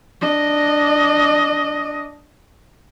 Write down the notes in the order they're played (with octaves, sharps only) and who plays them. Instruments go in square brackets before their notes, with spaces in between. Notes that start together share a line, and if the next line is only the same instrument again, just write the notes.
[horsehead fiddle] D4 D#5